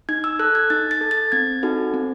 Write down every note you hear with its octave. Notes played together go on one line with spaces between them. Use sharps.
D#4 G#6
E6
A4 F#6
G#6
D#4 A6
A6
A4
A6
C4 G#6
D#4 F#4 A4
C4